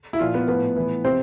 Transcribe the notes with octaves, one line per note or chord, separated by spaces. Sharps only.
E4
A#2 F3 F4
B3 B4
A2 F3 B3 B4
A2 E3
C3 F3 C4 C5